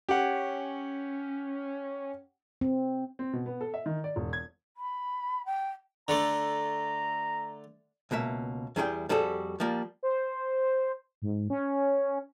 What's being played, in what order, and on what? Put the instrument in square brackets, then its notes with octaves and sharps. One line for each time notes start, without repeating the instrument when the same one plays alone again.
[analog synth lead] C#4 [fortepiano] G4 F#5
[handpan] C4
[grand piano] C4
B2
B3
A4
E5
D#3
D5
E1
G#6
[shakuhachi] B5
G5
[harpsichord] D3 A3 [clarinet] A#5
[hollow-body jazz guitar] C#2 B2 A#3 E5
E2 G3 E4 G#4 B4 G5
F2 G3 F#4 G#4 A4
F3 G3 A#3
[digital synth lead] C5
G#2
C#4